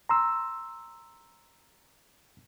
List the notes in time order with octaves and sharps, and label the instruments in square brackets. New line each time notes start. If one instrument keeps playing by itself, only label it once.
[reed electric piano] A#5 C6 E6